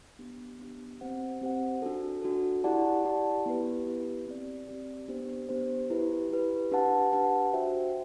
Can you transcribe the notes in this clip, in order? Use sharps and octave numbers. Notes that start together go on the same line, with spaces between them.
B3 D4 G4
B3 D4 G4
C4 G4 C5 F#5
C4 G4 C5 F#5
D4 F#4 A4
D4 F#4 A4
E4 G4 D5 F#5 A5
E4 G4 D5 F#5 A5
B3 E4 G4 B4
B3 E4 G4 B4
C4 G4 D5
C4 G4 D5
B3 D4 G4 C5
B3 D4 G4 C5
E4 G4 B4
E4 G4 B4
D4 G4 B4 F#5 A5
D4 G4 B4 F#5 A5
D4 F#4 C5 E5 G5